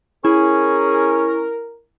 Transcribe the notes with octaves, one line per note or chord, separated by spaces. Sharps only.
C#4 E4 G#4 A#4